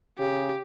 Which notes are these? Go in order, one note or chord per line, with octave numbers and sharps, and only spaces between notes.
C#3 G4